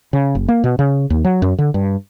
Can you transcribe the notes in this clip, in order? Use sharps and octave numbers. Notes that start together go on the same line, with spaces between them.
C#3
F#1
A#3
B2
C#3
D#2
F#3
F#2
D3
G2